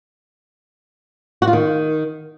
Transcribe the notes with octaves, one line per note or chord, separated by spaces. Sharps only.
F#4
F4
D#3